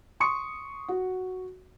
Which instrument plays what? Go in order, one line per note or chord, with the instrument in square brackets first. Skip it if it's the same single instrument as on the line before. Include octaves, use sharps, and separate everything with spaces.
[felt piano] C6 C#6 D#6 C#7
F#4